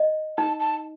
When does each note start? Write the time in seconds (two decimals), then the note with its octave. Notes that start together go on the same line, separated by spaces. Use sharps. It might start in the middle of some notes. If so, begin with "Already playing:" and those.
Already playing: D#5
0.38 D#4 A5
0.60 A5